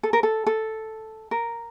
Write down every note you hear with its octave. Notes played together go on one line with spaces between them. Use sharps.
A4
A#4
A4
A4
A#4